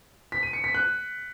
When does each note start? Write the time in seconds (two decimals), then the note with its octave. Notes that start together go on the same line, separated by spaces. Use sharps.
0.32 B6
0.43 D#7
0.53 C#7
0.64 B6
0.74 F#6